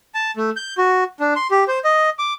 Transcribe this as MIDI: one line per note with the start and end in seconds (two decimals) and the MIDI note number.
0.15 0.31 81
0.37 0.50 57
0.56 0.74 91
0.78 1.04 66
1.20 1.34 62
1.36 1.47 84
1.51 1.64 67
1.68 1.79 72
1.84 2.10 75
2.19 2.33 86